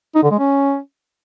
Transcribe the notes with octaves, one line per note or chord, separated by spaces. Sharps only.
D#4
D3
G#3
C#4